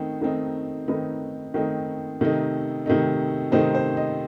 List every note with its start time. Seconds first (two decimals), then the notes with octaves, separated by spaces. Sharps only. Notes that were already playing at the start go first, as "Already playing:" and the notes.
Already playing: D#3 A3 C4 D#4
0.22 D#3 A3 C4 D#4
0.88 D#3 A3 C4 D#4 B4
1.54 D#3 A3 C4 D#4
2.21 C3 D#3 A3 D#4
2.86 C3 D#3 A3 D#4
3.52 C3 D#3 A3 D#4 C5
3.75 C5
3.97 D#5